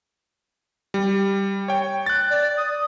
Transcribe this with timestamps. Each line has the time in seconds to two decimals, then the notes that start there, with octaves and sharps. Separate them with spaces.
0.94 G3
1.68 C#5 G5
2.06 F#6 A6
2.30 D5
2.57 D#6